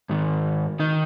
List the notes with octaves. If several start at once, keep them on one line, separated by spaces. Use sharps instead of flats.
G#2 D#3
D#3 D#4